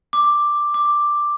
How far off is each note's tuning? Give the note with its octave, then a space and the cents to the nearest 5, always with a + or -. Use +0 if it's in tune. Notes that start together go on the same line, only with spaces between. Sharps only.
D6 +5
D6 +5